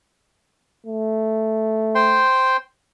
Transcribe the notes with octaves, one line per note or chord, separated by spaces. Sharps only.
A3
C5 G5 C6